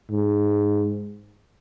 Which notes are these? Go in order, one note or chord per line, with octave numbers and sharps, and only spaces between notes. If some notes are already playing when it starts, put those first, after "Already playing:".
G#2